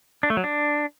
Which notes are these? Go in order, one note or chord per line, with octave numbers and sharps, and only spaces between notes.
D4
A3
F#3
D4